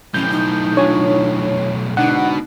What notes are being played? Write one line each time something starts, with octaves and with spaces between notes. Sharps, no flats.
B1 A2 C#4 G6
D#4
D4 F4 C#5 G#5
G#2 B2 D3 D4 D#4 F#5